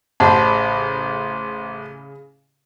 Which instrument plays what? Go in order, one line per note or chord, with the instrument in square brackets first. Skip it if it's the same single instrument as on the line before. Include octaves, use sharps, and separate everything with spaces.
[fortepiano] A1 [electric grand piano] C#3 B5 [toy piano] G4 F#5 A5 [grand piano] C5